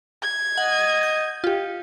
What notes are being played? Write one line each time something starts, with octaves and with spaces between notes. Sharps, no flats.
G#6
D#5 F#5
G6
F4 G4